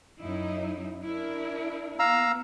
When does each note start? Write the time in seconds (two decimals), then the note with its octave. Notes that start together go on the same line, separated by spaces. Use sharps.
0.21 F#2 D#4 E4
1.01 D4 E4 A#4
1.99 B3 F5 A#5 E6